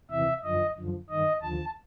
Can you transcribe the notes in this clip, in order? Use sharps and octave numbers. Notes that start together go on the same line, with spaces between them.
E2 C3 E3 E5
F#2 D3 F3 D#5
F#2 D3 F3
G2 D#3 D#5
D#2 D3 F3 A5